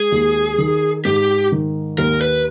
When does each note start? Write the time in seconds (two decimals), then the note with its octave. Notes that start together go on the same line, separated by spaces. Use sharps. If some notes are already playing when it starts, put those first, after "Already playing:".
Already playing: G#3 G#4
0.12 D#2
0.58 D#3
1.05 G#2 G4
1.52 D#3
1.98 D#2 A#4
2.21 B4